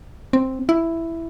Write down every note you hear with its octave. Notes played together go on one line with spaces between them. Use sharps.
C4
E4